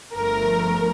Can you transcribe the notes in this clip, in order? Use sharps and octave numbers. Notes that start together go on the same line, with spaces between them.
G1 G2 F3 A3 A#4